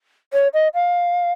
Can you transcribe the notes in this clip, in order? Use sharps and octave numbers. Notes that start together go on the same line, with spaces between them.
C#5
D#5
F5